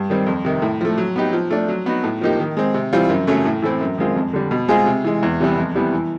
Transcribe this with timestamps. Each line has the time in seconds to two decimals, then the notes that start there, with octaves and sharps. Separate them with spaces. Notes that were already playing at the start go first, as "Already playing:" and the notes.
Already playing: G2
0.10 D#3 G3 C4
0.26 F2
0.45 C3 D#3
0.62 A2
0.81 F3 A3
0.98 F#3
1.16 B3 D#4 G4
1.33 F3
1.50 A3 D4
1.68 F#3
1.86 B3 D#4 F#4
2.04 A2
2.21 F3 A#3 D#4 G4
2.40 D#3
2.57 G#3 C4
2.74 C3
2.93 E3 G3 C4 F4
3.09 F#2
3.27 C#3 F#3 A3 C#4
3.45 A2
3.62 E3 A3 C4 E4
3.81 F#2
3.98 D#3 G#3 C4 F4
4.16 F2
4.33 D3 G3
4.51 B2
4.68 G#3 C4 F4 G#4
4.86 C3
5.04 E3 G#3
5.23 E2
5.40 C3 E3 G3 B3
5.58 F2
5.75 C3 E3 G3 B3
5.93 E3